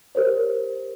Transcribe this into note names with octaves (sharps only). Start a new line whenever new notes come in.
G4 A#4 C5 C#5